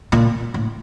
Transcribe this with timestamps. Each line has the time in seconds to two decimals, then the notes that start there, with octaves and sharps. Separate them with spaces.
0.12 A#2
0.54 A2